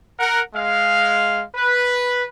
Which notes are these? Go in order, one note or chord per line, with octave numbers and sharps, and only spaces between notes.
A#4 F#5
G#3 F5
B4